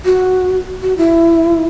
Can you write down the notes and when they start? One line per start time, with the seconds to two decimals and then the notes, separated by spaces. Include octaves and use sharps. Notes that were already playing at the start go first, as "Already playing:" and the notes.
0.05 F#4
0.82 F#4
0.98 E4